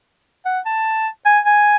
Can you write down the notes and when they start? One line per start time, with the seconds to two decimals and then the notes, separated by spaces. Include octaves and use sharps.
0.45 F#5
0.66 A5
1.25 G#5
1.46 G#5